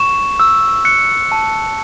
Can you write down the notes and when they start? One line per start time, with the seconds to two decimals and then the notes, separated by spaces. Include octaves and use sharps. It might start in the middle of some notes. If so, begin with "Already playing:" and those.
Already playing: C#6 E7
0.40 E6
0.85 F#6 C#7
1.32 A5